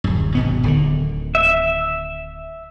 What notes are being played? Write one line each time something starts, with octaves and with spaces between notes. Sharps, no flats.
D1 F#2
G#1 B2 B3
D1 D3 D#3
E5